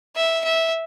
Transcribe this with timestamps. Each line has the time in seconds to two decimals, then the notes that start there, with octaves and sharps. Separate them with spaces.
0.16 E5
0.44 E5